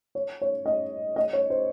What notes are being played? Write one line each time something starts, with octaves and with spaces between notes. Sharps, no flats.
C#5
C#5
D#5
D#5
C#5
C5